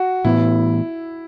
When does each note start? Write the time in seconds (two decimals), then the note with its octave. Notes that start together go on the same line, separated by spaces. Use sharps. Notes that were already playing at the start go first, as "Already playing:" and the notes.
Already playing: F#4
0.25 A2 E3 B3 E4